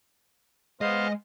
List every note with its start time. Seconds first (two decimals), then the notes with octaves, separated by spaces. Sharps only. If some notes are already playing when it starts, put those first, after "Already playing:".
0.81 G#3 B3 C5 D#5 F5